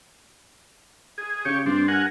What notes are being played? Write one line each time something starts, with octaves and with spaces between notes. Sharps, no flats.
G#4
C#3 G4 C#5
G2 C4 D4
A#4 F#5 G#5